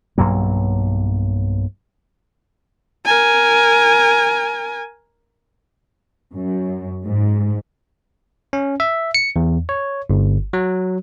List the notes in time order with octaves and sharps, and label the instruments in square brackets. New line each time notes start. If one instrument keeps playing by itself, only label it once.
[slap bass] B1 G2 F#3 A#3
[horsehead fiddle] A#4 G#5
[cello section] F#2
G#2
[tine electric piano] C#4
E5
C#7
E2
C#5
G1
F#3